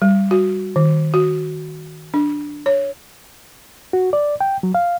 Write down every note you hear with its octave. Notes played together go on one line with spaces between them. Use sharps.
G3
F#4
D#3
F#4
D4
C#5
F#4
D5
G5
F#3
F5